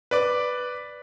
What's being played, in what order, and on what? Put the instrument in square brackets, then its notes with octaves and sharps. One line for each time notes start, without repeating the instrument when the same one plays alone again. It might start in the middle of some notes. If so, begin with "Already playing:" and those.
[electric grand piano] B4 D5 D6